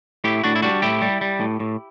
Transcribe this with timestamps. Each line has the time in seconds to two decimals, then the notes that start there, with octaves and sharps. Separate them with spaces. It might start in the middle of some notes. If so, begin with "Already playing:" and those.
0.24 A2 E4 G4
0.44 A2 D4 F#4
0.55 E4
0.62 G3 D4 F#4
0.82 A2 E4 G4
1.02 G3
1.21 G3
1.40 A2
1.60 A2